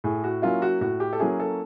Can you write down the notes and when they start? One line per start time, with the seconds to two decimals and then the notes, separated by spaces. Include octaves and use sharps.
0.04 A2 G#4
0.24 F#4
0.42 F#3 A#3 C#4 E4 F4
0.62 F#4
0.81 A2 F#4
1.00 G4
1.13 A4
1.20 F#3 A#3 C#4 E4 G#4
1.40 A4